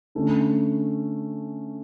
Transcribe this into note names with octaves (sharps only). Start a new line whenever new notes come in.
D3 A3 C#4